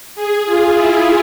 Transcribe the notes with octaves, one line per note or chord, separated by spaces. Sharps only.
G#4
F4
E4